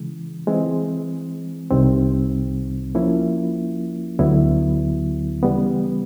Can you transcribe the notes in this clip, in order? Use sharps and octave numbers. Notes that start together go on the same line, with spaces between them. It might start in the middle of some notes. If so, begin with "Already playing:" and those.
Already playing: C#3 E3 G#3
E3 G#3 C4
C2 C3 D#3 G3 C4
F3 A#3 C#4 E4
D2 D3 F#3 B3 E4
C#3 E3 G3 B3